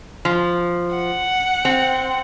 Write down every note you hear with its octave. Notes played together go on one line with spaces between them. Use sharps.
F3
F#5
C4